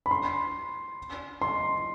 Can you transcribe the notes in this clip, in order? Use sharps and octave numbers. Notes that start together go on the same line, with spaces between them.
B5
C6
C6